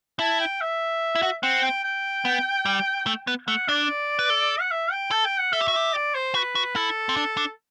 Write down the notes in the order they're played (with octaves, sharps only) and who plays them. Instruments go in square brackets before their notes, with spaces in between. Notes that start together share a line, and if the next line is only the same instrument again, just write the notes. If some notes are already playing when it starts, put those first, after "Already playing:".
[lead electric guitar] E4 [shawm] A5
[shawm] G5
E5
[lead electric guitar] E4
F#4
[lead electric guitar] C4 [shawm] F#5
[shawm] G5
G5
[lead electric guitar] B3
G3
A3
B3
[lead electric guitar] A3 [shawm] F#5
[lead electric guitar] D4 [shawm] D5
[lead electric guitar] B4
A4
[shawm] F#5
E5
G5
[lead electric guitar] A4 [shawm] A5
[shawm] G5
F#5
[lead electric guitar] A4 [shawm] E5
[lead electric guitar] G4
F#4
[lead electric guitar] G4 [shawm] E5
[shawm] D5
C5
[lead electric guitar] F#4 [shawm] B4
[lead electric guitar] F#4
[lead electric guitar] E4 [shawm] A4
[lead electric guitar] C4
D4
D4